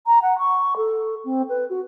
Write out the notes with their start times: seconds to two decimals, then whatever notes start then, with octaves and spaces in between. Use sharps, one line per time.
0.06 A#5
0.22 F#5
0.38 C#6
0.76 A4
1.25 C4
1.49 B4
1.69 F#4